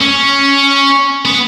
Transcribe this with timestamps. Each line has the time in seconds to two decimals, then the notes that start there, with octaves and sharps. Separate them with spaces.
0.01 C#4
1.25 B3